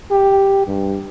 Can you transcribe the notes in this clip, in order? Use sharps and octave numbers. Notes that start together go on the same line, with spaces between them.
G4
G2